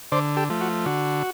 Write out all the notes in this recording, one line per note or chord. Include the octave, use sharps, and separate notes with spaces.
D3 C5 D5
G4 A4
F3 A3
F#4
D3 F#4